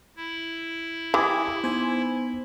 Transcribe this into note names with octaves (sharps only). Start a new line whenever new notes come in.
E4
E3 G4 D6 D#6 G#6
B3 D#4 C5 G#5